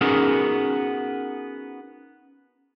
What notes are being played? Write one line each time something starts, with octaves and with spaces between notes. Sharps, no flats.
B3 C#4 D#4 F#4 G#4 A#4